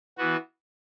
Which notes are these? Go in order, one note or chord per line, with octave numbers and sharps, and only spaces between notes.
E3 B3 F#4